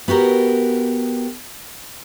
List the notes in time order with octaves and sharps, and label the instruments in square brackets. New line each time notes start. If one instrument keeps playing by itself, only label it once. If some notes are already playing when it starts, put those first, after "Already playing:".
[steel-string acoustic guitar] B3 F#4 G4 A#4